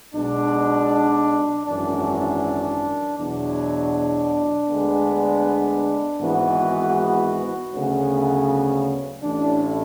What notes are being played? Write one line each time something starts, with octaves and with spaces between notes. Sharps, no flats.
B1 B2 G#3 D4
G#1 F#2 E3 D4
D4
E2 B2 F#3 D4
D2 D3 G#3 B3
G#1 G#2 E3 B3 F#4
D2 C#3 F#3 B3
A1 A2 E3 D4